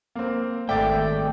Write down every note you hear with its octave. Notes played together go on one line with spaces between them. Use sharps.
A#3 C4
G#1 A3 D5 E5 G5 D6 A6